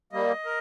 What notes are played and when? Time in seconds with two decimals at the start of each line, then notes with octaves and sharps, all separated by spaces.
0.12 G3 A#3 D#5
0.45 A#4